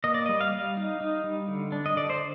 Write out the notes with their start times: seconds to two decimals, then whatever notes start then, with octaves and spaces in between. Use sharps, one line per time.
0.04 A#3 D#5
0.14 D5
0.26 G3 D#5
0.41 F5
0.53 G3
0.77 D#4
1.01 D#4
1.24 G3
1.48 D3
1.72 D4
1.86 D#5
1.96 D3 D5
2.10 C5